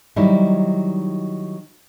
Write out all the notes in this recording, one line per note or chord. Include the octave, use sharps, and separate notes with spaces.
D#3 F#3 G3 D#4 E4